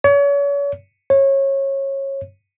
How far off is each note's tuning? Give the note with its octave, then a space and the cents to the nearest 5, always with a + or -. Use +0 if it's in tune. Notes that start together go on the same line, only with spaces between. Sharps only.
C#5 +40
C#5 -20